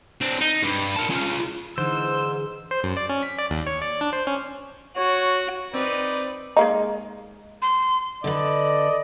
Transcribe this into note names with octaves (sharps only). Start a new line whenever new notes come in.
C4 D4
D#4
G2
A#4 A5
C#4 F4
G#2 D3 E3 C5 E6
C5
F#2
D5
C#4
B6
D5
D#2
C#5
D5
D4
C5
C#4
F#4 C#5
C4 D#4 B4 D5
G#3 A#3 D#4
C6
D3 A4 B4 D5 D#5